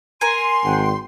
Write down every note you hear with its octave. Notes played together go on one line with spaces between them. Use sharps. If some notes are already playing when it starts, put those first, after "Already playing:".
A#4 G#5 C6 D#7
G#1 F#5 G5